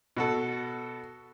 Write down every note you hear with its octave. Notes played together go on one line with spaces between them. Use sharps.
B2 F#4 A4